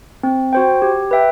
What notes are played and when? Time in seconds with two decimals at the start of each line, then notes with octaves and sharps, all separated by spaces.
0.23 C4
0.53 F#4 C5 G5
0.82 G4
1.11 B4 E5 G5